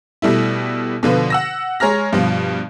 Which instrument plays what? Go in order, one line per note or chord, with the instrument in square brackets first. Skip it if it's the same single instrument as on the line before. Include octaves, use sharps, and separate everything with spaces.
[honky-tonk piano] B2 G3 A3 E4
B2 D3 F3 B4
F#5 E6 A#6
G#3 C#5 A#5 F6 A#6
G2 B2 F3